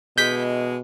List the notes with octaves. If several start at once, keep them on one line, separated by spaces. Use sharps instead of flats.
B2 D3 E3 G#3 G6 B6